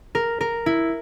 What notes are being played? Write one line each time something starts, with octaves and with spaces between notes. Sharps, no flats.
A#4
A#4
E4